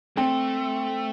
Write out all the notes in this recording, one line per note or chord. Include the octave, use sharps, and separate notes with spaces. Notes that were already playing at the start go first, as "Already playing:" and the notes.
A3 C4